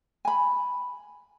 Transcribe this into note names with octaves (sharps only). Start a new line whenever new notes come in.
G#5 B5